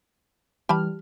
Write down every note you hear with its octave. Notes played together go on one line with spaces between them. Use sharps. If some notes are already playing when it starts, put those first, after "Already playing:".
E3 G3 G4 A5 B5 F6